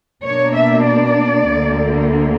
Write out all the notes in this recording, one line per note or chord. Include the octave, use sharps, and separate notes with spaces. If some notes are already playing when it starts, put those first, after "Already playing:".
B2 A#3 D4 C#5
E5
D5
D2 D3 A#3